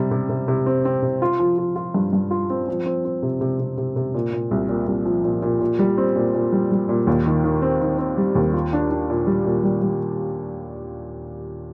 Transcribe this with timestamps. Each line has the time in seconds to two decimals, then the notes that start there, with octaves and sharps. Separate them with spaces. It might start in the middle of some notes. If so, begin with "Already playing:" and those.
Already playing: C3 G3
0.11 C3
0.29 C3
0.48 C3
0.66 C4
0.85 C4
1.02 C3
1.22 F4
1.39 F3
1.58 F4
1.76 F4
1.94 G2
2.13 G2
2.31 F4
2.50 C4
2.68 F3
2.86 C4
3.05 C4
3.23 C3
3.41 C3
3.60 C3
3.77 C3
3.96 C3
4.14 A#2
4.33 A#2
4.51 C2
4.69 A#2
4.87 C2
5.05 F3
5.24 A#2
5.42 A#2
5.60 A#2
5.79 G3
5.98 C4
6.16 A#2
6.34 A#2
6.53 G3
6.72 G3
6.89 A#2
7.07 D#2
7.26 D#3
7.44 D#3
7.62 C4
7.81 D#3
7.99 C4
8.18 G3
8.35 D#2
8.54 F4
8.73 D4
8.91 D4
9.10 A#2
9.27 G3
9.46 A#2
9.64 G3
9.82 G3